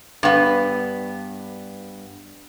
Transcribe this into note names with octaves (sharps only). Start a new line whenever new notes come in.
G2 B3